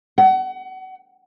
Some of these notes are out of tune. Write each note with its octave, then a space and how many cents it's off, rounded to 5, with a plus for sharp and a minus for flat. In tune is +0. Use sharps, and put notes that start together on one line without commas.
F#5 +30